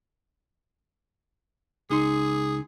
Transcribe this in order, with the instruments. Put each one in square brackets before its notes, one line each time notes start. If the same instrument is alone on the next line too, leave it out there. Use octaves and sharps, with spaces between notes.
[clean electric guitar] C#2 D#4 C6 [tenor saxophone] G#4